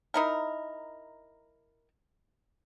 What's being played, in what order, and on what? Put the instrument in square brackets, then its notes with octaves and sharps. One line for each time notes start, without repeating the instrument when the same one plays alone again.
[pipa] D#4 E4 A#4